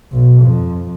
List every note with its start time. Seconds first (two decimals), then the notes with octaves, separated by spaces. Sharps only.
0.12 B1
0.42 F2